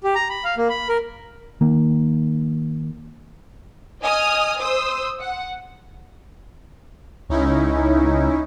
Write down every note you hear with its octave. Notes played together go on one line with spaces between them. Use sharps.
G4
A#5
B5
F5
A#3
B5
A#4
D#3 A#3
D#5 G#5 D#6 F6
C5 D#6 E6
F#5
C#2 C#4 D#4 E4